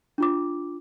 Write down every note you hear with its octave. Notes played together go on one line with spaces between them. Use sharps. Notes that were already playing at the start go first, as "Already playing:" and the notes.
D4 F4 D6